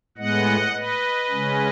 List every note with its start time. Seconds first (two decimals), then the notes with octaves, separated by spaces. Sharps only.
0.18 A2 G#3 B3 D#5 F#5
0.73 B4 D#5
1.29 C#3 G#3 C#4